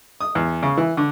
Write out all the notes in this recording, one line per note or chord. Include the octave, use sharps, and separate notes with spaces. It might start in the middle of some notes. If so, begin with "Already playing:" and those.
D#6
E2
C#3
E3
D3